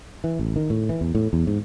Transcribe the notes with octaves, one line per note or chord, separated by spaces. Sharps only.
E3
A1
D#3
A2
E3
E2
A2
E2
G#2